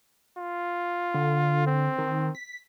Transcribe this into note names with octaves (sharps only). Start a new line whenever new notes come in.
F4
D3
C4
D#3
B6